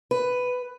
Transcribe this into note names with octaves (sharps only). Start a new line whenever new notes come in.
B4